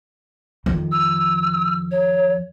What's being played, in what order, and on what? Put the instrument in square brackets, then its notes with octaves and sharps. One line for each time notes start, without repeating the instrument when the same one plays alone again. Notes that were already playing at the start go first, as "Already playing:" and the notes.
[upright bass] F2 D#3
[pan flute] E6
C#5